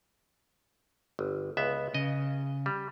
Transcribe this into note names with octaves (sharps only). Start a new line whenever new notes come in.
G1
C#2 B3 E5
C#3 D#5
G3